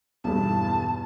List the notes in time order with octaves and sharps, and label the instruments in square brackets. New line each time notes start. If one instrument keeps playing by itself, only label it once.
[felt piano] B1 E2 G2 [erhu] A5